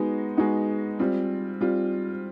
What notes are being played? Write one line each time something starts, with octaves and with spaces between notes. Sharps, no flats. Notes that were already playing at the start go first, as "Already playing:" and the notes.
Already playing: G#3 B3 D#4 F#4
G#3 B3 D#4 F#4
G3 C4 F4
G3 C4 F4